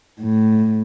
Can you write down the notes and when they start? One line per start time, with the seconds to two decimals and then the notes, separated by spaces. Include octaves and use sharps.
0.20 A2